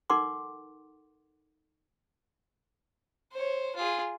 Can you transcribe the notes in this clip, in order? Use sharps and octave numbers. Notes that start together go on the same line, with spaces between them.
D#4 A4 A#4 F#5 C6 D6
C5 C#5
F4 G#4